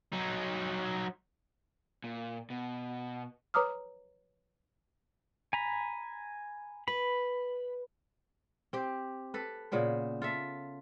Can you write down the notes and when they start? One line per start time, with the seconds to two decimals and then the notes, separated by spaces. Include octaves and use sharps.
0.12 F#3 D#4
2.04 A#2
2.50 B2
3.54 B4 C#5 A#5 D6 D#6 F6
5.53 G#5 A#5 B5
6.88 B4 B5
8.73 C4 G4
9.34 A4 B4
9.72 A#2 C#3 B3 C5
10.22 F4 A4 E5